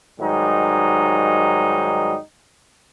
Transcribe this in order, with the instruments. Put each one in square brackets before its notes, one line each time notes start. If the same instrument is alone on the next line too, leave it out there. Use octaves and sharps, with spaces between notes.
[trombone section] G#2 D#3 F#3 G3 D#4